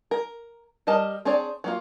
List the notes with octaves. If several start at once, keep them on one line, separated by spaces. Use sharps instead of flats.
A#4
G3 A#4 D#5 A5
C4 D4 G#4 C#5 D5
F#3 A#3 F4